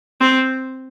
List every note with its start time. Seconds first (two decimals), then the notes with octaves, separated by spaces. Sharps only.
0.21 C4